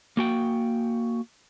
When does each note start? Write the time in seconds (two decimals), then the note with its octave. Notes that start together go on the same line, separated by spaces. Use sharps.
0.17 A#3 F#4 G5